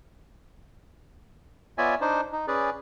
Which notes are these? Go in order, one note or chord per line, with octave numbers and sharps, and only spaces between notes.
B3 F4 C#5 D5 E5 G#5
D4 D#4 C5
D#4
C#4 G#4 B4 D5